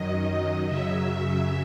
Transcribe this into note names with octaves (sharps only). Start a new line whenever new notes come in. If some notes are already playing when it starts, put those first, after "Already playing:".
Already playing: F#2 D#3 F#3 D#5
F#2 C#3 F#3 E5